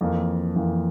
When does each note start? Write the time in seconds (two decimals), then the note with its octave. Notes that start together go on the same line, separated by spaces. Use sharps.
0.01 F2 E3 A#3
0.56 F2 E3 A#3